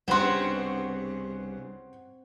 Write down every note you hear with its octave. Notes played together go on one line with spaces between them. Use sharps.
C2 G2 C#3 B3 C4 F#4 F#5 C6